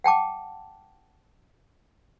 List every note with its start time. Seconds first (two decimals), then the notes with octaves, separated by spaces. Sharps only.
0.04 F#5 G5 A5 D6